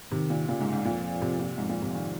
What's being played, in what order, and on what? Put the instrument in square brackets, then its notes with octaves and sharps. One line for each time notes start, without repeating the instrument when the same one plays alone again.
[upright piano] C3 [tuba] D#3
[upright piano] A#2
[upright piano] A#2 [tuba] C#3
[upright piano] G#2
G#2
[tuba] F2 [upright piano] A#2
[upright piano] C3
A#2
[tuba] F2 [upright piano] G#2
[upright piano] A#2
C3
D#3